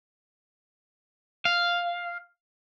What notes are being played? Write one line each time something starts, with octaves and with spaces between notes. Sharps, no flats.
F5